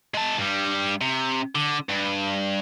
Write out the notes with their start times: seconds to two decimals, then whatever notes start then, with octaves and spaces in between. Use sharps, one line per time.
0.14 G#3 A5
0.38 G2 G3
1.01 C3
1.55 D3
1.89 G2